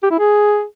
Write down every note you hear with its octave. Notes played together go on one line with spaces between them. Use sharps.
G4
E4
G#4